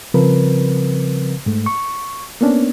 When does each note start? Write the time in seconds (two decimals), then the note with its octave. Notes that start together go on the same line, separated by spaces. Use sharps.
0.14 C#3 F3 G3 C4 A#4 B4
1.46 G#2 A3
1.66 C#6
2.41 A#3 B3 C#4 D4